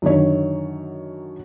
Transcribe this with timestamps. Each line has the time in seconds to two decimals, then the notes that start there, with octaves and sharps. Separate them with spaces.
0.02 F#2 D3 D#3 C#5